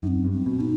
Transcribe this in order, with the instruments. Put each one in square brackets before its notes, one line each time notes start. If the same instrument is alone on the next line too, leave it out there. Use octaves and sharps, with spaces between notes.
[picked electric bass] F#2 [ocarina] C4 D#4
[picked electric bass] G2
[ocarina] C4
[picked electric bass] B2
[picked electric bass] B2 [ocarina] D#4